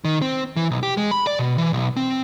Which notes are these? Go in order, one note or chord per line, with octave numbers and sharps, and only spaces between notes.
D#3
C4
E3
B1
G4
G#3
B5
D5
B2
E3
B1
C4